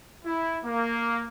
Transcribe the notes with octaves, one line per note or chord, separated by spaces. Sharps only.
E4
A#3